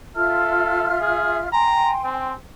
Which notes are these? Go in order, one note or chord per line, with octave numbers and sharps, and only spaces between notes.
F4 A4 E5 F6
G#4
G5 G#5 A#5 C6
C4